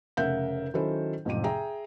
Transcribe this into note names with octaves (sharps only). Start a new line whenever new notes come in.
F1 C#3 A#4 E5 F#5 G6
D#3 F#3 C#4 E4 A4 C5
A1 F2 G#2 C3 G4 D#7
G#4 E5 G5 A#5